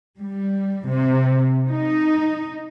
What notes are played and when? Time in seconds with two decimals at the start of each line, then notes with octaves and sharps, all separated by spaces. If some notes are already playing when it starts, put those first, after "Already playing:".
0.19 G3
0.85 C3
1.69 D#4